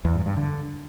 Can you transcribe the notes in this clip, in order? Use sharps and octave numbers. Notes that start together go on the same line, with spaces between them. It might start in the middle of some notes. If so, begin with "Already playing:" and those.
E2
G2
G2
D3